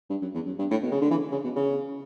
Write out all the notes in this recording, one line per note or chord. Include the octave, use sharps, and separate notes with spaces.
G2
F#2
E2
F#2
G2
A2
B2
C#3
D3
E3
C#3
B2
C#3